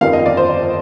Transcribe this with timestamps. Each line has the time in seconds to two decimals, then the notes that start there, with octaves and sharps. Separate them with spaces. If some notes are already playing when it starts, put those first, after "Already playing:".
0.01 G1 F2 D#3 G3 F5
0.13 D#5
0.26 D5
0.37 C5